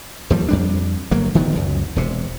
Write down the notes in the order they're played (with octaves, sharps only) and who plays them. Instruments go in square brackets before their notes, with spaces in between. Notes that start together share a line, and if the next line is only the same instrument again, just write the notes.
[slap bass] D#2 F3 G3
F2 G3 D4
G1 F#3 A#3
D#1 D#3 F3 B3
C#2 F#2
E1 C3